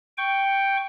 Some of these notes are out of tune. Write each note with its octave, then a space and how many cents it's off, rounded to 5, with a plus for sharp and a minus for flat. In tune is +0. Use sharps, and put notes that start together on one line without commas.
G5 +0 C#6 +10